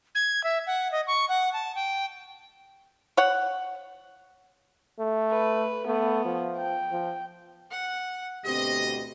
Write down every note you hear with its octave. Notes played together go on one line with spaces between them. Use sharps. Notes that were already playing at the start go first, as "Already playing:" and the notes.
G#6
E5
F#5
D#5
C#6
F#5
A5
G5
C#5 F#5
A3
B4
A3 B3
F3
G5
F3
F#5
D2 B2 C4 G4 D#5